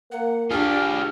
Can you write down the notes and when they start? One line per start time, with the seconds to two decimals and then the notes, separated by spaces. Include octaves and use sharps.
0.12 A#3 F#5
0.51 D4 F4 G4 G#4 F6